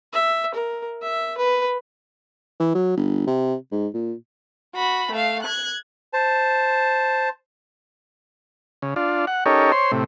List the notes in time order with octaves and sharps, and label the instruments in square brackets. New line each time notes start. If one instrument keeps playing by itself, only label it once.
[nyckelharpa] E5
A#4
E5
B4
[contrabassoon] E3
F#3
G1
C3
G#2
A#2
[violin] F#4 B5
A3 F5
F#6 G#6
[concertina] C5 A5
[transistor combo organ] C#3
D4 F4
F#5
C#4 D#4 G4 A4 A#4 C#5
C5 C#5 C6
A2 C3